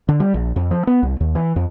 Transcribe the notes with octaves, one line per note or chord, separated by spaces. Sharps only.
D3
G3
A#1
F2
F3
B3
C2
D#2
E3
F2